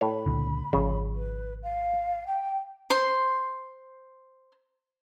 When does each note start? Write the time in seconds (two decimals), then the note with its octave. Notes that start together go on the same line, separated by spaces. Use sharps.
0.01 A2 C#5 B5
0.26 C#2 A#2 D3
0.73 G#1 C#3 F3
1.14 B4
1.62 F5
2.26 G5
2.90 C5 C6